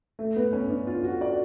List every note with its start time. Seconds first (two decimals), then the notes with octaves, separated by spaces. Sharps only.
0.19 A3
0.36 B3
0.53 C#4
0.70 D4
0.87 F4
1.04 F#4
1.21 D5